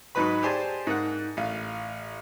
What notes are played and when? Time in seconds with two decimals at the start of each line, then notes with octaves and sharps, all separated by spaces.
0.15 G#2 F#3 D#4 B4 B5
0.43 G4 G#4 C5 D5 G#5 A5
0.87 G#2 A#3 F#5
1.37 A1 F5